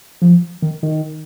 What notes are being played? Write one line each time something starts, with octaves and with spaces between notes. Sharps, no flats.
F3
D#3
D#3